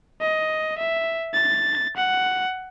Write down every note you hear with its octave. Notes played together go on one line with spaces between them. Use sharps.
D#5
E5
A6
F#5